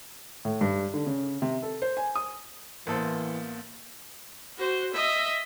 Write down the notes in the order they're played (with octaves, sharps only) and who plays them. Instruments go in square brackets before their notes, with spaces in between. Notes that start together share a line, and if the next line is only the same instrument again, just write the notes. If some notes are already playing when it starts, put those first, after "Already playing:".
[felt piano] A2
G2
D3
C#3
C3
A4
C5
G#5
D#6
[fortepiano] A1 A4 C5 [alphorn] E3 [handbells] A#3 B3 A#4
[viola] F#4 C5
D#5 E5